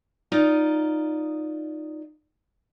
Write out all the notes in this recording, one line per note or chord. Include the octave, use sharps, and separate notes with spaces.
D#4 F4 D5 D#5